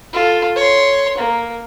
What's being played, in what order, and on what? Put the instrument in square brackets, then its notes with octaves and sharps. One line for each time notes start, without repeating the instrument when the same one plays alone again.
[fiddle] F4 A4
C#5 C6
A#3